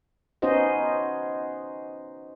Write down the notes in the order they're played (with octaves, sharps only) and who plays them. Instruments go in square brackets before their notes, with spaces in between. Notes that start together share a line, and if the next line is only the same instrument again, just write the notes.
[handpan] B3 C#4 D#4 F#4 C5 D#5